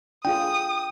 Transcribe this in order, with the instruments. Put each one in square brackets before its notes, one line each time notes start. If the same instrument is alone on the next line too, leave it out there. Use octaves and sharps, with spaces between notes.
[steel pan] D4 F4 G#4 [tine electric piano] G5 [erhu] D#6